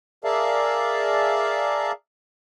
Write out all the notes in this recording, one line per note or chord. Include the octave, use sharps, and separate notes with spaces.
G#4 A#4 D5 E5 F5 A5